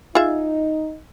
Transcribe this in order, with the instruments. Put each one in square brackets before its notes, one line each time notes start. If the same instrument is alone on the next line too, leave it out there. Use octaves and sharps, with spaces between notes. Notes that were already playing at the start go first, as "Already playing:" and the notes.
[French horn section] D#4 [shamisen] F4 G#4 E5